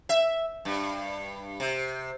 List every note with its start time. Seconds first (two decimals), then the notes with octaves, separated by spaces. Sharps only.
0.09 E5
0.65 G2
1.60 C3